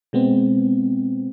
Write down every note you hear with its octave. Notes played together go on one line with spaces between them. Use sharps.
B2 G#3 B3 C4